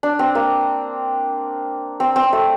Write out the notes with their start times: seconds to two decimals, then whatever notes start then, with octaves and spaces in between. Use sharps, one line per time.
0.03 D4
0.19 C4
0.35 A#3
2.00 C4
2.16 C4
2.33 A3